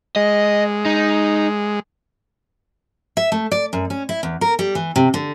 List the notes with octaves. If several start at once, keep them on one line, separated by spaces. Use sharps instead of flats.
G#3 D#5
D#4
E5
A3
D5
F#2
C#4
E4
E2
A#4
G3
E3
C3
D3